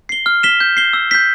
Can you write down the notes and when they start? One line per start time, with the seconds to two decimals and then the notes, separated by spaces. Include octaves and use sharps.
0.09 C7 G7
0.26 F6
0.43 B6 E7 G7
0.61 G6
0.77 C7 G7
0.93 E6
1.11 G6 B6